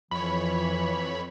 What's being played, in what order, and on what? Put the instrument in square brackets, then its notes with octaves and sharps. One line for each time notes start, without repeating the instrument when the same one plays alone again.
[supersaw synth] F2 C#5 [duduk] E3 [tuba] F3 [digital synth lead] B5